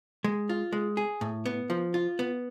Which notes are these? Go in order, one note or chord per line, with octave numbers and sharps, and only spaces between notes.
G#3
F4
G#3
G#4
A2
B3
F3
F4
B3